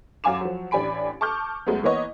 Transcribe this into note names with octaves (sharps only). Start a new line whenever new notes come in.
F#2 F#3 F5 G#5 D6 E7
F3 F#3
A1 D4 G4 G#5 B5 D7
A5 C#6 D6 F6 G6
F#2 G#3 A3 B3
E3 A#3 B3 B4 C#5 D#5